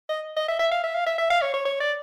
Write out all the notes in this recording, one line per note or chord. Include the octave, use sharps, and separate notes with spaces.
D#5
D#5
E5
E5
F5
E5
F5
E5
E5
F5
C#5
C#5
C#5
D5